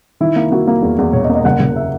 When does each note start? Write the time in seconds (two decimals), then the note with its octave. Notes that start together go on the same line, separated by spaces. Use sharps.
0.20 D#3 E4
0.36 A#3
0.51 A#3 F#4
0.67 A#3
0.82 E2
0.98 E2
1.13 E1 C#5
1.24 D#5
1.29 A#3
1.35 D#5
1.45 F#1 F#5
1.60 F#1
1.76 E5